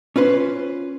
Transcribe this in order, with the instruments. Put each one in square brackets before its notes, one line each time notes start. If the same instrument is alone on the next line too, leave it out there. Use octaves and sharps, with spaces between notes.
[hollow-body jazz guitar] C#4 F4 B4 C5